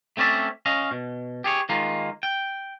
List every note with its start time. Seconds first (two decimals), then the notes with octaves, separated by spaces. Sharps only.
0.17 A3 C4 C#4 D5 E5
0.66 C#4 D#5 F5
0.91 B2
1.44 G4 G#4 C#5
1.69 D#3 G#3 A#3 D#4 F4
2.23 G5